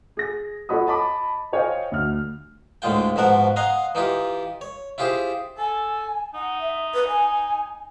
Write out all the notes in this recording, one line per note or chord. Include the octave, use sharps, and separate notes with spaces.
G#4 A#6
F4 A4 C#5 F#5 B5 D#6
D#5 A5 B5 D6
C5 C#5 D#5 F5 G5 G#5
D2 F6
D2 A2 D3 G#3 F4 G5
G#2 B2 F3 A#4 F#5 C#6
D#5 F5 F#5 G#5 A#5 C6
E3 D#4 F4 G4
C#5
E4 F4 G4 G#4 C5
A4 G#5
D#4 F#5
E5
B4
G#5